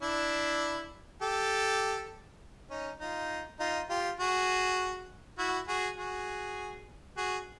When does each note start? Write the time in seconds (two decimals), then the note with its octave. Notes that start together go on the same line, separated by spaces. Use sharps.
0.02 D4 E4
1.22 G4 A4
2.70 C#4 D#4
3.00 D#4 F4
3.60 D#4 F4
3.90 F4 G4
4.20 F#4 G#4
5.38 E4 F#4
5.68 F#4 G#4
5.98 F#4 G#4
7.17 F#4 G#4